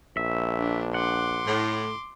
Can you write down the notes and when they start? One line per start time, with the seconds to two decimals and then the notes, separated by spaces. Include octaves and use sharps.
0.17 A#1 E5
0.59 D4
0.94 F#5 C6 D6
1.46 A2